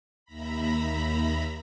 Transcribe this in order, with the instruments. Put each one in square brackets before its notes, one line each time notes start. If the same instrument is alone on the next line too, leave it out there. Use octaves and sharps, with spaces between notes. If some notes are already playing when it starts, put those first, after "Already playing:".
[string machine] D#2 E5 A#5 B5